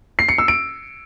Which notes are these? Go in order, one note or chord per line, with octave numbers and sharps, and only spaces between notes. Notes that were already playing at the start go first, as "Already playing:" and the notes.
C7
C#7
E6
D7